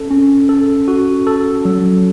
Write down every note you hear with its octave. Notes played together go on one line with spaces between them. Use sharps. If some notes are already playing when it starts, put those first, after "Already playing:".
Already playing: C#4 A4
C#4
A4
F#4
A4
F#3